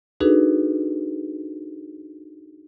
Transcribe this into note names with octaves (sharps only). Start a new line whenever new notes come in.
D4 D#4 F#4 G#4 A4 B4